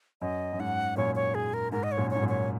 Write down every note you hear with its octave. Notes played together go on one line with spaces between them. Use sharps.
F#2 D#5
F#2
G#2 F#5
F#2 A#2 C#5
C#5
G#4
A#4
G#2 A#4
D#5
C#5
F#2 A#2
C#5
G#2
F#2 A#2
C#5